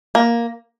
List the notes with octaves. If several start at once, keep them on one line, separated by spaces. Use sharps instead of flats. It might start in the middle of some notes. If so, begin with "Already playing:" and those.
A#3